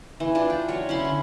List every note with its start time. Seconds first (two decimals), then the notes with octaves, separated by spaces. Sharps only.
0.20 E3
0.35 D4 F4 D5
0.50 G5
0.68 F#3 C#5
0.89 C#4 E4 B5 C6
1.05 D3